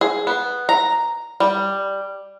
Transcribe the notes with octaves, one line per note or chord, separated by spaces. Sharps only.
G#4
B3
A#5
G3